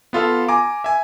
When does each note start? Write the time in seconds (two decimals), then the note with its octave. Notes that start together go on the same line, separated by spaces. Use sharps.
0.13 B3 F4 A4 F5
0.48 G#5 A#5 D6
0.84 E5 G#5